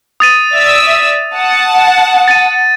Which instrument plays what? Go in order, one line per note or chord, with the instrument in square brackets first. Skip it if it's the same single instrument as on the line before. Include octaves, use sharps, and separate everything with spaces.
[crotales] D#6 A6 D#7
[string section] D5 E5 E6
F#5 A5
[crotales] A6 D#7